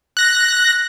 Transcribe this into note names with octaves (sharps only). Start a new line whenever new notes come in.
F#6 A#6